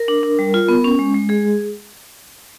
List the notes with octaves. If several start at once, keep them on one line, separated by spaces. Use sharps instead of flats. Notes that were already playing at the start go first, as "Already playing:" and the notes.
Already playing: A#4
D4
D4
G3
F4
B3
C#4
G#3
G#3
G#3 G#4